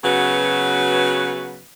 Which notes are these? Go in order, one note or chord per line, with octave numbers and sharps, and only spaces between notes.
C#3 F#3 B3 F#4 B4